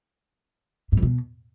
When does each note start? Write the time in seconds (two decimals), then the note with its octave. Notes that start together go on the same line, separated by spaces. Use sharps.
0.92 G#2
0.97 F2
1.02 B2